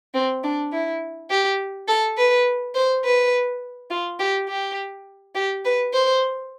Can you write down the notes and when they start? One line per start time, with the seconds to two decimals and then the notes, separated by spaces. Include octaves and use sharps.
0.14 C4
0.44 D4
0.72 E4
1.30 G4
1.88 A4
2.18 B4
2.74 C5
3.04 B4
3.90 F4
4.19 G4
4.49 G4
5.35 G4
5.65 B4
5.93 C5